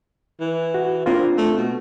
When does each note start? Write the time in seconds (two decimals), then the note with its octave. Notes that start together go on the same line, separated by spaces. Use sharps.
0.40 E3
0.74 F#4
1.06 A#3 C4 D4 F4
1.38 A3
1.57 B2